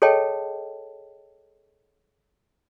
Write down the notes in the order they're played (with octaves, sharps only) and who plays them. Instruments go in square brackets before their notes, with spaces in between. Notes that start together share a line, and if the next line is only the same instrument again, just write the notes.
[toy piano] G#4 A4 C#5 D#5 G5 A5